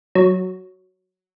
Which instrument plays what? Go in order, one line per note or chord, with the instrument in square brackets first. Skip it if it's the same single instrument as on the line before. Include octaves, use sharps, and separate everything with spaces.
[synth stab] F#3